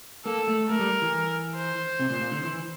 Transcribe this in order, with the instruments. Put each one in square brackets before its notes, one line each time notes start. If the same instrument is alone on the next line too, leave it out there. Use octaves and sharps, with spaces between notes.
[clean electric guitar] A#3 [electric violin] A4
[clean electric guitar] A3
[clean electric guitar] A3 [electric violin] A#4
[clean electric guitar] G3
E3
[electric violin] C5
[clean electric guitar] C3
A#2
A#2
D3
E3